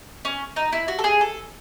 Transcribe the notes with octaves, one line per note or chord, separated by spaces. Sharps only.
C#4
D#4
E4
F#4
A4
G#4
A4